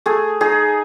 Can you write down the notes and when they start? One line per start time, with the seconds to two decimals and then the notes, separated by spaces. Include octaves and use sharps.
0.06 A3 G#4
0.41 D#4 G#4